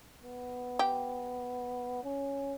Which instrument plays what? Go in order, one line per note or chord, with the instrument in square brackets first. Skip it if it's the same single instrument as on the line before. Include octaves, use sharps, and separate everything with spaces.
[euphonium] B3
[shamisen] G4
[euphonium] C#4